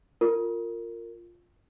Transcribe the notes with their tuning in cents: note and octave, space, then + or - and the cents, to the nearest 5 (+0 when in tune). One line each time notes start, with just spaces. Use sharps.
F4 +0 A#4 -20